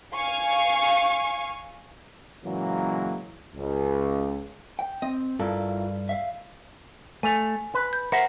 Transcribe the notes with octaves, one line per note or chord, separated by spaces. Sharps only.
F5 G#5 C#6
A#2 C#3 E3 F#3 G#3 A#3
C#2
G5
C4 D#5
G2 E4 F4 A4 A#4
E5 F5
A3 G#5 F7
B4
G6
A#4 C5 E5 F#5